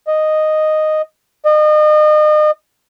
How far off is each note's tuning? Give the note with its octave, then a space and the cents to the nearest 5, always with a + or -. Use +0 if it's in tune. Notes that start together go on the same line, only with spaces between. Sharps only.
D#5 -5
D#5 -35